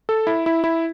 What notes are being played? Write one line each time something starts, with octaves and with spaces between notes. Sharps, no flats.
A4
E4
E4
E4